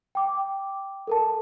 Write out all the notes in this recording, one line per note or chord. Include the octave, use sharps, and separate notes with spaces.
G5 D6
A4 A#4 A5